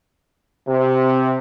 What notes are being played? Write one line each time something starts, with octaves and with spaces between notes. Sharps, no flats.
C3